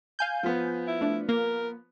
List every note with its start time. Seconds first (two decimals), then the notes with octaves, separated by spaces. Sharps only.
0.19 F5 G#5 G6
0.43 F3 B3
0.88 E4
1.01 A3 D4
1.29 A#3 A#4